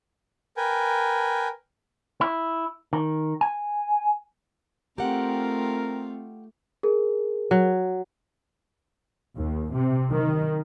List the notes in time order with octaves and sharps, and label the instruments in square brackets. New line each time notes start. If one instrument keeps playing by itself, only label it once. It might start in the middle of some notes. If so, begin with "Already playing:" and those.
[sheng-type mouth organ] A#4 B4 G5 G#5
[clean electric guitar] E4
D#3
G#5
[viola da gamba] A3 F4 [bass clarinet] C4 [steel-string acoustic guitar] G4 F#5 [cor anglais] A#4
[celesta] G#4 A#4
[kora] F#3
[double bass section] D#2
C3
D#3